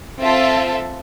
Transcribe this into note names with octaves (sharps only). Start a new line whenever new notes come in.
C4 F4 A4 E5